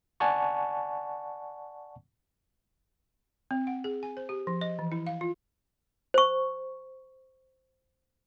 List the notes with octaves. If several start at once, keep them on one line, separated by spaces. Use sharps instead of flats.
D5 F#5 G#5 A5 C#6
C4
F#5
G#4
G#5
C5
G4
F3
D#5
E3
E4
F5
F4
C5 C#6